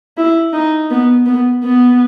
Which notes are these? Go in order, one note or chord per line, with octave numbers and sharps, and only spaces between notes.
E4
D#4
B3
B3
B3